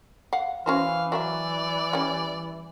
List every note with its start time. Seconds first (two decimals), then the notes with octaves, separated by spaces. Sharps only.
0.33 F5 F#5
0.66 E3 C#4 F#4 C5 F5
1.12 F#3 B4 D5 E5
1.93 G3 C#4